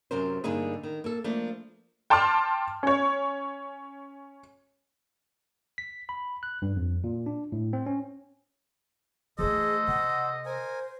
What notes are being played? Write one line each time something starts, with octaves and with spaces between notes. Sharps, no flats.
F#2 C3 C#4 A#4 C5
G2 D3 A#3 D#4 G#4
D#3
A#3 A4
F3 A3 A#3 D4
G5 A5 C6 D6 F6
C#4 C#5
B6
B5
F#6
G2
F2
A#2
D4
A2
C4
C#4
E3 A3 G#4 A4 C5 D#5
C3 F#5
A#4 C5 G#5